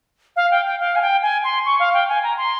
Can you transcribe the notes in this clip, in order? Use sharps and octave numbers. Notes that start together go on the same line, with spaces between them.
F5
G5
G5
F5
G#5
G5
G#5
C6
C#6
F5
G5
G#5
A#5
C6